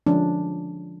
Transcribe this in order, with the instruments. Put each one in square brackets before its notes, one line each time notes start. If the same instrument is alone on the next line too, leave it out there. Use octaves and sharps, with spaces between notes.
[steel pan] D3 F3 G#3 C#4 D4